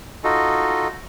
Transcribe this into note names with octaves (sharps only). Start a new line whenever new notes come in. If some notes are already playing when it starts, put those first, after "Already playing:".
D#4 F4 F#4 A4 D#5